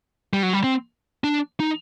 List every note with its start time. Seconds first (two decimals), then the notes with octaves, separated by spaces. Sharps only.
0.33 G3
0.43 F#3
0.53 G3
0.64 C4
1.24 D4
1.60 D#4